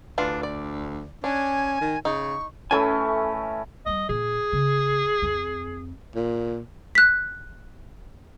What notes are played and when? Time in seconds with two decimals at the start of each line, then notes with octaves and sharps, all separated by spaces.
0.18 D2 E3 D4 F4
0.43 D5
1.24 C#4 D4 G#5
1.81 D#3
2.05 C#3 D#4 C#6
2.71 E3 A3 C#4 A4 G#5
3.86 G3 B3 D#5
4.09 A#2 A#3 G#4
4.53 C#3
5.22 F2 C4
6.15 A#2
6.95 F#6 B6